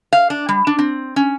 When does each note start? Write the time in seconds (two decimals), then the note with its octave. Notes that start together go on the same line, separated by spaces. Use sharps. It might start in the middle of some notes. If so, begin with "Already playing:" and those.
0.13 F5
0.30 D4
0.49 G3
0.67 D4
0.79 C4
1.16 C#4